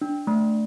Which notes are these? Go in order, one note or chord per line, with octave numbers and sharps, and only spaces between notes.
D4
A3